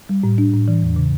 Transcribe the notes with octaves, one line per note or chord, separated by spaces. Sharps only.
G3
A2
D4
A2
E3
E2
C#3